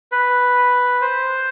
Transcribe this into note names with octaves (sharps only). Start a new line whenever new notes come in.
B4
C5